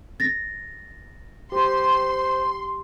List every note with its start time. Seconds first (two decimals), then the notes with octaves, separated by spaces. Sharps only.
0.20 A6 A#6
1.52 G4 C5 C6